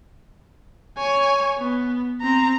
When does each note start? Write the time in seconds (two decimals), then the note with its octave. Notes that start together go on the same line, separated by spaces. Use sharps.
0.98 C#5 G#5
1.58 B3
2.21 C4 A#5